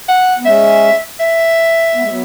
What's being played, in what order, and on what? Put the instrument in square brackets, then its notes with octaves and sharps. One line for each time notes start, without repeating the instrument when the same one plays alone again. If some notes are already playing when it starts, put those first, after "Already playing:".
[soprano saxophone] F#5
[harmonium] B3
[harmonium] G#3 C#4 [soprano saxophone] E5
[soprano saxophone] E5
[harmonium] B3
G#3
F#3 B3